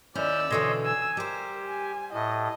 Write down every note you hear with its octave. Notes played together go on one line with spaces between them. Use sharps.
D#2 C#4 E4 D5 E6 F6 G6
B2 D3 E3 C#5 D#5 C6
G#5 E6
G3 G4 A#4 C5
G#5
A2 D#5